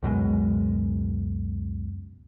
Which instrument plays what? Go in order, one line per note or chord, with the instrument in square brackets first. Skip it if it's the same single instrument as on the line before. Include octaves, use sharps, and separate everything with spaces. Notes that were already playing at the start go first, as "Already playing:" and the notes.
[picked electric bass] C#2 F#2 B2 G#3